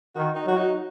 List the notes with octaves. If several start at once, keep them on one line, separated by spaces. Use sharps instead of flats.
D#3 F#4
D#4
F#3 F#4
D#4